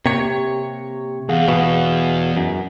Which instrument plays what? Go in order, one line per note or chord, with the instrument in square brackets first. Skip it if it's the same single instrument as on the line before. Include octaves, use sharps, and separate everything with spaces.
[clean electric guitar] C3 C#5 [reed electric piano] A#3 G4
[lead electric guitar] E2 [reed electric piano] G#4 F5 F#5
[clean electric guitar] B2
F#2